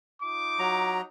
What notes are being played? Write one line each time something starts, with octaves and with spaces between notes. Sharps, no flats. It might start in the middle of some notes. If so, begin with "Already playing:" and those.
D#4 F4 D6
F#3 A#5